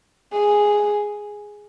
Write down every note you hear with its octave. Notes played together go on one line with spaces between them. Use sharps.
G#4